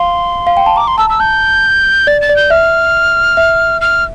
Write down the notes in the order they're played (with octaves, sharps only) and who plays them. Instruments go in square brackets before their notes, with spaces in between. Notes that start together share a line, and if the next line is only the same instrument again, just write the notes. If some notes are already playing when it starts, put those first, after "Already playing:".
Already playing: [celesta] F5 [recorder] C6
[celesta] F5
G5
A5
[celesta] A#5 [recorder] D6
[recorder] C6
[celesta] A5 [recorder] E6
[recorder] E6
[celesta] A5 [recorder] G6
[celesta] D5 [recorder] A6
[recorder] A6
[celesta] D5
[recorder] G6
[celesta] E5 [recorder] F6
[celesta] E5
[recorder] F6